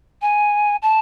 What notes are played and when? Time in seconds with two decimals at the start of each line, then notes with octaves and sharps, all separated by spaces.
0.22 G#5
0.82 A5